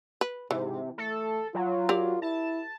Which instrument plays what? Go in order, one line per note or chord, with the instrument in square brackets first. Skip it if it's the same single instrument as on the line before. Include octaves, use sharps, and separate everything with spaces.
[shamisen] B4
[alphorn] G#2 [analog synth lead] C3 [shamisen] E3
[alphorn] A3 [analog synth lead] A4
[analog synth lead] F#3 [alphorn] F4
[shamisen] G4 A#4 D5
[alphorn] E4 [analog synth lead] A5